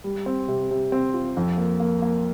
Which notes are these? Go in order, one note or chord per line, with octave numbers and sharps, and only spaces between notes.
G3
C4
C3
C3
C4
F4
F2
A#3
A#3
A#3